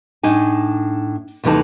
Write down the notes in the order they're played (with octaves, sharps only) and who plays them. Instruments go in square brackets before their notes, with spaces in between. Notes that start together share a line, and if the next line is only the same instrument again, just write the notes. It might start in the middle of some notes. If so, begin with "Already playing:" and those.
[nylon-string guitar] A2 D4 D#4 G#5
D#2 C3 E3 A3 D#4 A5